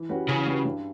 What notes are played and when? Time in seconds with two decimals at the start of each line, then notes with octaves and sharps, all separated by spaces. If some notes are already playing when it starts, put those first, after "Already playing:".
Already playing: E3
0.09 G3 C#4 F#4 B4
0.27 C#3 E3
0.46 G3 C#4 F#4 B4
0.65 G2